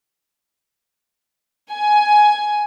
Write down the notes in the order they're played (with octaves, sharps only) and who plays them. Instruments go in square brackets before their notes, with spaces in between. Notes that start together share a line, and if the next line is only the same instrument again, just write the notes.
[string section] G#5